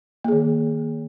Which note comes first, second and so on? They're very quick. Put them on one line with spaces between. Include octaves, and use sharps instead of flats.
A#3 G#4 D#3